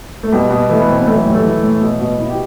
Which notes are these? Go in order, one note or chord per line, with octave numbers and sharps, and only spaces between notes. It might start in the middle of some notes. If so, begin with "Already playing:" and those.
A3
B2 G3
B2
E3 A3
B3
A2 C4
B3
E3 A3
F#3
A2 G3
A3
E3
A2
B2
B2
B2 E4
G4